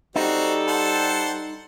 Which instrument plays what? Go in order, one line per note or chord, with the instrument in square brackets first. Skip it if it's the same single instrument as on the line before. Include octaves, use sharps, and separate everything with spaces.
[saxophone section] G3 [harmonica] C4 F#4 [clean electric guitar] D#4 [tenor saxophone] A4
[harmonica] C5 F#5 A5